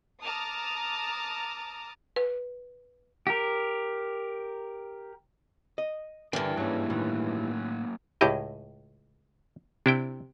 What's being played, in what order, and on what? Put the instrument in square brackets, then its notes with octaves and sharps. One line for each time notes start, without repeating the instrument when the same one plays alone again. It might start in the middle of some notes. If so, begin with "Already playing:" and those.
[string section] A5 A#5 D6 D#6 F6
[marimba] B4
[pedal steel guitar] G4 A#4
[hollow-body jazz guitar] D#5
[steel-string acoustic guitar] G2 E3 [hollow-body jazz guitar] D3 E4 [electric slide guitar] A#4 G5
[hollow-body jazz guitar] G#2 C#4 [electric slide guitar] F#3 A#3
[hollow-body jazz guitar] A2 D#3
[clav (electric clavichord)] C#2 A2 D#5 [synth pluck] E4 G4 G6
[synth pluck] C3 [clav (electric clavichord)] D4 E4 G5